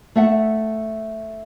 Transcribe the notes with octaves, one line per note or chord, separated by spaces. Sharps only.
A3 E5 F#5